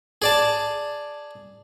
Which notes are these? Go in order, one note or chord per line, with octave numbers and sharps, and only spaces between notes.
G#4 D5 A5